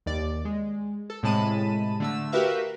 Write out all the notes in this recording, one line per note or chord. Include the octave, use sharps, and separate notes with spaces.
D#2 D5
G#3
A4
A2 C3 G#3 A5 B5 D#7
D3 A3 E6
F#4 G4 A#4 B4 E5 F5